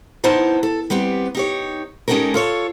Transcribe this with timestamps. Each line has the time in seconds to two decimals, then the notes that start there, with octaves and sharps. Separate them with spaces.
0.24 B3 D#4 E4 C5 A5
0.63 A4
0.90 G3 B3 C4 G4
1.35 D#4 G4 C#5
2.08 G#3 C#4 D#4 G4 A4 A#4
2.34 F4 A4 C#5